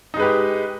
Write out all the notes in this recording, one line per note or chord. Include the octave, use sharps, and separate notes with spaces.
G#3 D#4 G4 B4